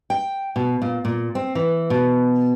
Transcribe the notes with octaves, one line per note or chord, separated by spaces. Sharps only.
G5
B2
A#2
A#2
C4
E3
B2